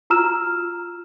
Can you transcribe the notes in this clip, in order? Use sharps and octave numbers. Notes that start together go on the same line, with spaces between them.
F4 F#4 A#5 E6 F6 E7